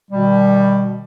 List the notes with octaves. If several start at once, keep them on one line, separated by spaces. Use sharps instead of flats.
B2 D#3 G3